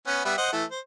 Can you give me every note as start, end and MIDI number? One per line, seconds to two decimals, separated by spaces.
0.07 0.22 59
0.07 0.22 61
0.25 0.35 55
0.25 0.35 59
0.25 0.35 76
0.38 0.51 72
0.38 0.51 75
0.38 0.51 78
0.52 0.64 52
0.52 0.64 57
0.71 0.80 72